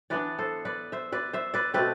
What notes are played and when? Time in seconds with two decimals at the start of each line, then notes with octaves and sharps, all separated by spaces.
0.10 E3 B3 D4 B4 D5
0.39 A4 C5
0.65 B4 D5
0.92 C5 E5
1.12 B4 D5
1.33 C5 E5
1.54 B4 D5
1.74 B2 A3 C4 B4 D5